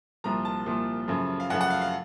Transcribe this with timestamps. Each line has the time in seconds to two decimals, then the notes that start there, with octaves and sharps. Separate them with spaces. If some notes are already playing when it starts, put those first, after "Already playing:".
0.24 C2 A#2 F3 A#5
0.45 A5
0.66 C2 A#2 F3
1.08 F#2 C#3 F3 A3
1.40 F5
1.50 F#2 C#3 F3 A3 F#5
1.61 F#5
1.70 F5
1.82 F5